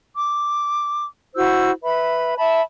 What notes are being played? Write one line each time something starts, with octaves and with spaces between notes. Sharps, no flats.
D6
E4 F#4 C5 E6
B4 E5 B5
E5 A5 B5